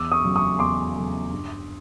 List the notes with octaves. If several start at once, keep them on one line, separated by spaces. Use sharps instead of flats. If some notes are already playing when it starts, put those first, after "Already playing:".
Already playing: E2 D6 E6
C#6 D#6
C#3 F#3 A3
C#6 D#6
E2 C6 D6
C#3 F#3 A3
G2